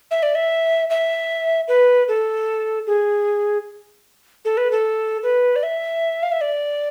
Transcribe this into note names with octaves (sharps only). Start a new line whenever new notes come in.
E5
D5
E5
E5
B4
A4
G#4
A4
B4
A4
B4
D5
E5
F5
E5
D5